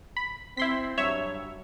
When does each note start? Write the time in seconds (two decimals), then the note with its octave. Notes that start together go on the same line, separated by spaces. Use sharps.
0.17 B5
0.57 C4 E4 C6 B6
0.98 G2 F#3 C#5 E5